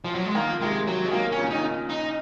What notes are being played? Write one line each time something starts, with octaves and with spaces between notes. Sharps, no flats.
F3
F#3
G#3
D#3 A#3
F3
C3 D#3 G#3
F#3
G#3
D#3 F#3 A#3
C#4
A#2 C#3
D#3 D#4
A#2 C#3
D#4